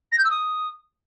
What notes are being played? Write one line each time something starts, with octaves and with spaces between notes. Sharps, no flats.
A#6
G6
E6
D#6